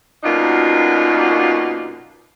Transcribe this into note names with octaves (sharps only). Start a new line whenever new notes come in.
F#2 B2 A#3 D4 D#4 F4